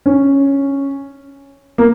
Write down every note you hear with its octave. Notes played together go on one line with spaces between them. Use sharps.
C#4
A#3